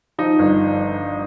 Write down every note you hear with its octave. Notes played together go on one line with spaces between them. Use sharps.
F3 D#4
G1